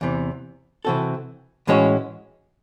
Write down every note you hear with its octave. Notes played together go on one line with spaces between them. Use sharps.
E2 C3 E3
C3 E3 C4 F#4 A4
A2 E3 G#3 C#4 F#4